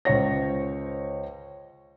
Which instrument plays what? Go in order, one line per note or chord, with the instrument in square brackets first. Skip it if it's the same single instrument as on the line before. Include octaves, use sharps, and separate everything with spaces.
[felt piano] C#2 C5 C#5 A#6